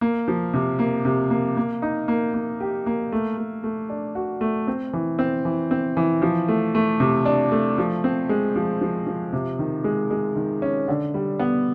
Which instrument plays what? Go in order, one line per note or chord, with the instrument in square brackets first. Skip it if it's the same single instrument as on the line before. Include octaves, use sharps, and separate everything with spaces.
[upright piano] A#3
F3
C3
A#3
C3
A#3
A#3
D#4
A#3
A#3
G4
A#3
A3
A3
A3
D4
F#4
A3
C4
E3
C4
E3
C4
E3
F3
A3
A3
C3
D4
A3
F3
C4
G#3
F3
F3
F3
C3
D#3
G#3
G#3
D#3
C#4
D3
G3
B3